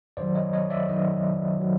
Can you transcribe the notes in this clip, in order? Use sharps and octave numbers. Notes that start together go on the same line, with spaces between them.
F#2 D#3 F#3 C5 D5
C#5 D#5
C#5 D#5
D5 E5
F#2 D#3 F#3 C#5 D#5
D#3 F#3